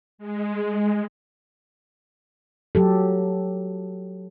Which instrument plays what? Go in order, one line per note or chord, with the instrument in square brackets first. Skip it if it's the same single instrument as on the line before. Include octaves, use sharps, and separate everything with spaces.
[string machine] G#3
[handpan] F#3 G4 A4